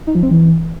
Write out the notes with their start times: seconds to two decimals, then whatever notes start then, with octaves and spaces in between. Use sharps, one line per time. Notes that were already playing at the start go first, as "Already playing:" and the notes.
0.07 D#4
0.15 F3
0.23 C4
0.31 E3